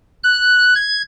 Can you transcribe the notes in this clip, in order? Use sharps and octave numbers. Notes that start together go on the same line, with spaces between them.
F#6
G#6